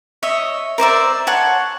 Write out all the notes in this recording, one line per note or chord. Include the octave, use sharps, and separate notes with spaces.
C#5 D#5 E5
A#4 C5 D5 E5
C#5 F#5 A5 C6